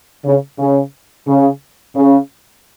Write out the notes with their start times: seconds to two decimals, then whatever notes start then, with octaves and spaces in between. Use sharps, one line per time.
0.25 C#3
0.59 C#3
1.27 C#3
1.95 C#3